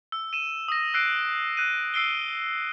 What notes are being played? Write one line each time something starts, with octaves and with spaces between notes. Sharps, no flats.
E6
D#7 E7
D#6 A#6
E6 F#6 C7 D7
F#6 D#7
E6 C7 D7 G7